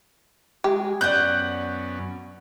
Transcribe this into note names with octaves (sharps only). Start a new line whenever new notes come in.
G#3 G4
F#2 B3 C#4 D5 F#5 F#6 G6